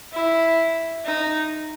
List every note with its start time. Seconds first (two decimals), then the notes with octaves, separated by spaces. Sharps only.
0.13 E4
1.06 D#4